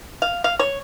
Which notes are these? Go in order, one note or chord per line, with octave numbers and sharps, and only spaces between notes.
F5
F5
C#5